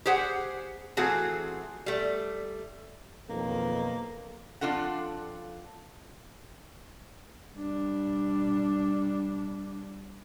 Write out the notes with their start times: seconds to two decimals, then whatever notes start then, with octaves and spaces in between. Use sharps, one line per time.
0.06 G4 G#4 C5 F#5
0.97 E3 A3 C4 F4 F#4 G#4
1.86 G3 A3
3.29 B1 F2 D#3 A#3
4.61 F2 E3 D4 F4 A4 F#5
7.57 G3 D4